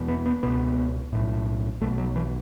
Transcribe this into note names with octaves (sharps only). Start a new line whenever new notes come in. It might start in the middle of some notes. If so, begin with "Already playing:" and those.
Already playing: E1 E2 B2
B3
B3
C#2 B2 B3
B1 A2
B1 B2 A3
F#3
E3